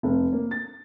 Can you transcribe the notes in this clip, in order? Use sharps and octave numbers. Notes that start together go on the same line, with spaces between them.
F1
A#3
A6